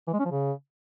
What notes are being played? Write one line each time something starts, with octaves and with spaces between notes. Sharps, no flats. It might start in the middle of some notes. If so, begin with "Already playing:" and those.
E3
G#3
C#4
F3
C#3